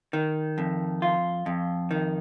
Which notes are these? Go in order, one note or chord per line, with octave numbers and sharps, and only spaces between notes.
D#3
F2
F4
F2
D#3